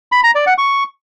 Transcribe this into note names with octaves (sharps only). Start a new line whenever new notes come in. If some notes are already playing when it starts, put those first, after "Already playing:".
B5
A#5
D5
F#5
C#6